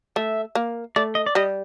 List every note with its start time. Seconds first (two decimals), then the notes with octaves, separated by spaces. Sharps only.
0.16 A3 E5
0.55 A#3
0.96 A3 D5
1.15 D#5
1.26 D5
1.35 G3 D#5